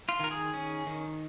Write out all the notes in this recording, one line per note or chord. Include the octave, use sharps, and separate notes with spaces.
F4
D#3 A#4
G#4
C#4
D#3